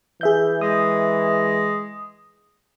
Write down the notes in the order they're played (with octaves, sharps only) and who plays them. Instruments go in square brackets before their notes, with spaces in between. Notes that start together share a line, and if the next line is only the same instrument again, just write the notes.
[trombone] E3 [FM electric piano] G#4 E5 G6
[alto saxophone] G#3 [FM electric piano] D#6